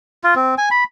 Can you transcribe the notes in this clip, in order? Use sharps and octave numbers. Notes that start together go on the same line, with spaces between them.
F4
C4
G#5
B5